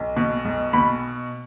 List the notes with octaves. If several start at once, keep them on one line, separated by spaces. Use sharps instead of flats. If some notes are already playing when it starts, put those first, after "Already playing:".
Already playing: B1
B2
B1
B2 B5